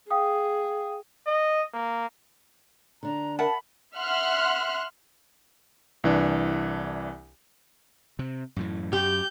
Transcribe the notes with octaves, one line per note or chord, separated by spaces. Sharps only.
G#4 F5 G5 D#6
D#5
A#3
D3 D4 A#5
A#4 E5 F#5 A5 B5
E5 F#5 C6 F6 F#6
C2 E3 D4
C3
F#2 A2 E3
F#2 G4 G6